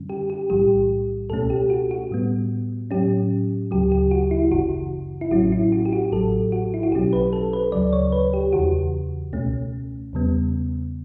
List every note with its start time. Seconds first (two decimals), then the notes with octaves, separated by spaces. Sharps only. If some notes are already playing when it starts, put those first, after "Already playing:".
Already playing: F#2 D3 G3 C#4
0.09 G4
0.30 G4
0.50 B1 A2 E3 G3 G4
1.30 C#2 B2 A3 C#4 A4
1.50 G4
1.70 F#4
1.91 F#4
2.11 A2 G3 B3
2.91 A2 F#3 C#4 G4
3.71 D2 C#3 F#3 G4
3.92 G4
4.11 F#4
4.31 E4
4.51 G1 F#2 C#3 E3 F#4
5.21 E4
5.31 A1 A2 F#3 C#4 F#4
5.52 E4
5.72 F#4
5.85 G4
5.93 F#4
6.12 A1 A2 F#3 A4
6.52 F#4
6.74 E4
6.83 F#4
6.92 B1 B2 F#3 C#4 G4
7.13 B4
7.33 A4
7.53 B4
7.72 D2 C#3 F#3 D5
7.93 C#5
8.12 B4
8.34 G4
8.53 E2 C#3 E3 F#4
9.33 C#2 B2 A3 C#4
10.13 E2 C#3 G3 B3